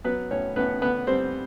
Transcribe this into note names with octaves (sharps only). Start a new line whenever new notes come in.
F#3 B3 B4
A2 C#4 C#5
A2 B3 B4
D3 B3 B4
G3 C4 C5